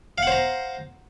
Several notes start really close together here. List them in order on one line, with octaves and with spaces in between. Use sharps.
F5 F#5 C5 A#5